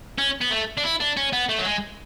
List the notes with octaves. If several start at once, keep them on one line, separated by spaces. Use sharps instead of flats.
C#4
B3
A3
D4
E4
D4
C#4
B3
A3
F#3
G#3